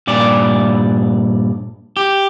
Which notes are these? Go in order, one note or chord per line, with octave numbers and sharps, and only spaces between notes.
G2 A#2 D5
G4